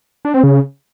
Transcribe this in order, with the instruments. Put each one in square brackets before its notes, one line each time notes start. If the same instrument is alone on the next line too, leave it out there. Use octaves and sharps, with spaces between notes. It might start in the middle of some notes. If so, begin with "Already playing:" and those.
[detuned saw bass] D4
C4
C#3